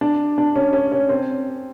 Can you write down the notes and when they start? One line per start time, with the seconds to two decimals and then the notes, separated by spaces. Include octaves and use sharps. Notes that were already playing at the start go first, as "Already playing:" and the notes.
0.01 D4
0.38 D4
0.56 C#4
0.73 C#4
0.92 C#4
1.09 C4